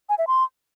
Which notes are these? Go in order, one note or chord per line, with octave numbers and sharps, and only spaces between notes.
G#5
E5
C6